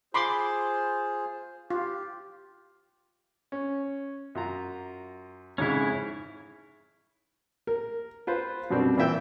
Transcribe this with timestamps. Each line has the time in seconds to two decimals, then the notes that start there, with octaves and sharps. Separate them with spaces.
0.14 F4 G#4 C5 B5 C6 D6
1.70 F4 G4
3.52 C#4
4.35 F#2 F4 A#5
5.58 F2 G#2 C#3 C#4 E4
7.67 A#4
8.27 F4 B4 C5
8.70 F#2 B2 G3 C4 D4
8.97 A#2 E3 F4 E5 G5 E6